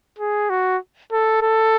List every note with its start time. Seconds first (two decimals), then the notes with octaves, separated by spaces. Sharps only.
0.19 G#4
0.50 F#4
1.12 A4
1.43 A4